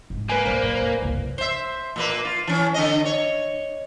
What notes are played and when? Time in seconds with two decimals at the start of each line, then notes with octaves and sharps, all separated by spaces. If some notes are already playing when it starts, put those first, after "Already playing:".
0.10 G#2 G#3
0.30 A#3 B4 G#5
0.45 B1 F#3 C5 D5
0.63 A2
0.81 E2
1.02 C2 F#2
1.38 C5 E5
1.96 A#2 A#3 B4
2.25 F4
2.48 E3 C#4
2.74 D3 C#4 D#5
3.05 C#5